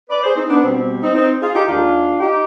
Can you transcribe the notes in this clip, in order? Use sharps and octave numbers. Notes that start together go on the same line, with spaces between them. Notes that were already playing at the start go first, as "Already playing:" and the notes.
B4 D5
G#4 C5
C4 D#4
B3 D4
B2 G3 C4
C4
C4 D#4
C4 D#4
F4 G#4
D#4 G4
D#2 D#3 G#3 D4 F4
D#4 G4